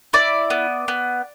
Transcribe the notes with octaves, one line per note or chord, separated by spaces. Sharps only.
E4 D5
B3
B3